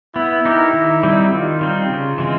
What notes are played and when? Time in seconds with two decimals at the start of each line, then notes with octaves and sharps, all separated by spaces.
0.16 B3 E4
0.45 D#4 G4 A#4
0.73 D#3
1.03 G3 C4 D#4
1.32 D#3 F4
1.61 G3 C4 D#4
1.90 C#3
2.18 E3 G#3 C4